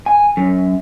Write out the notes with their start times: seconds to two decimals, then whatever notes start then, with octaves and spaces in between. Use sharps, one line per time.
0.06 G#5
0.37 F#2